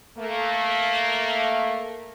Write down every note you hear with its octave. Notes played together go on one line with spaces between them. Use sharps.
A3 A#3